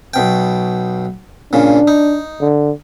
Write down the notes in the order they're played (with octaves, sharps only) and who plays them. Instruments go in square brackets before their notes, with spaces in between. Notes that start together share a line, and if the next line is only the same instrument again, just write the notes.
[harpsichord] B1 B2 G5
[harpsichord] A#2 C#3 [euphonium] D4
[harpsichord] D#4
[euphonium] D3